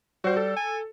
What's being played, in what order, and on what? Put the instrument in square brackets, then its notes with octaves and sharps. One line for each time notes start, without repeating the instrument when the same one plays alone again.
[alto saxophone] G3 [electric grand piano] F#4 C5
[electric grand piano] A4
[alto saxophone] G#5